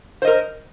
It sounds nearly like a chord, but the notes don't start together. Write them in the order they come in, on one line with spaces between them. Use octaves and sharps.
C5 D#5 A#4